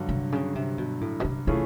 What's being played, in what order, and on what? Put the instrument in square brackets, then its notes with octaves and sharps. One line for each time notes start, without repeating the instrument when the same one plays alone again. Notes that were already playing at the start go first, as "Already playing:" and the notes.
Already playing: [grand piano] G2 D3 F#3
[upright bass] C3
C#3
C3
B2
A2
B2
C3
[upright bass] C3 [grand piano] E3 A3 C#4 F4 G#4